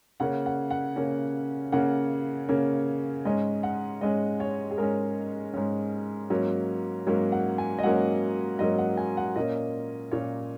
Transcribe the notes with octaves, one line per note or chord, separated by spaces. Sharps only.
C#3 A#3 C#4 F#5
F#5
F#5
C#3 A#3 C#4
C#3 A#3 C#4 F#5
C#3 A#3 C#4
G#2 G#3 C#4 D#5
F#5
G#2 G#3 C#4 D#5
C#5
G#4
G#2 G#3 C#4 A#4
G#2 G#3 C#4
G#2 F#3 A#3 C#4
G#2 F#3 A#3 C#4 C#5
F#5
G#5
D#5
G#2 F#3 A#3 C#4 F#5
G#2 F#3 A#3 C#4 D#5
F#5
G#5
F#5
A#2 A#3 C#4 D#5
A#2 A#3 C#4 C#5